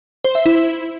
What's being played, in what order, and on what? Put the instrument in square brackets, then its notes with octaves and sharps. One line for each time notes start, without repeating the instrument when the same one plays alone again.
[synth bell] C5
E5
E4